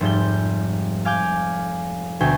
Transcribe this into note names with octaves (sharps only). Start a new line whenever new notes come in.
F1 G#2 G3 G6
F5 G#5 D6 F6 G6
D2 B2 G5 G#5